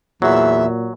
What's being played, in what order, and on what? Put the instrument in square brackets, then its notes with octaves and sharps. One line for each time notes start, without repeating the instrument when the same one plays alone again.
[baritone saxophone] E2 [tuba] A#2 [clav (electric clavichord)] F#3 [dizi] E5